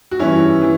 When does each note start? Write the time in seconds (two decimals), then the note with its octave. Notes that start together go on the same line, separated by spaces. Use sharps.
0.11 F#4
0.19 G2 E3 C#4 E4
0.61 E3